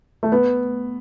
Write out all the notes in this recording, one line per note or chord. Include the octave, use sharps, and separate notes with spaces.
A3
B3